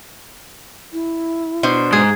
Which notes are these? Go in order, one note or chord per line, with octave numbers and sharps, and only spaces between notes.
E4
B2 D4 C5
G#2 G#4